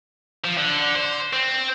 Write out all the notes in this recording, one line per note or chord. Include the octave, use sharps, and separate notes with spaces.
F3
D3
C5
C4